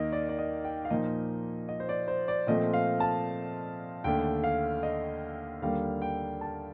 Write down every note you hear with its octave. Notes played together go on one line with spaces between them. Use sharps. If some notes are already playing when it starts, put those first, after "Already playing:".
Already playing: D#2 D#3 A#3 D#5
D5
D5
D#5
G5
F5
A#2 F3 A#3 D#4 D#5
D#5
C5
D5
C5
D5
A#2 F3 A3 C4 D#5
F5
A5
D#2 D3 A3 G5
F5
D#5
D#2 D3 G3 A#3 F5
G5
A5